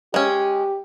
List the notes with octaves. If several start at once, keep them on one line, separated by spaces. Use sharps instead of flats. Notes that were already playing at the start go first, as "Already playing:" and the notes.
G#3 C#4 G4